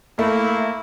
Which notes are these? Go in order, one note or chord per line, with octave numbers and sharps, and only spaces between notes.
A3 A#3 E4